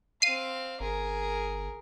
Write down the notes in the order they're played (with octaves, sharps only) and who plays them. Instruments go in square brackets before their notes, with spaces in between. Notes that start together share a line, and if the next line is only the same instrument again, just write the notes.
[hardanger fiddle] C4 F5 [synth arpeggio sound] C7 D#7
[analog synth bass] G1 [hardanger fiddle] G#4 A#4